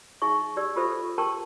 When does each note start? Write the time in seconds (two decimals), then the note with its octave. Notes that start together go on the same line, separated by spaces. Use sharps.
0.22 D#4 G#4 E5 C#6
0.57 G4 D5 E6
0.76 F4 G4 A4 C5 E5
1.18 G4 A#4 G5 A5 C6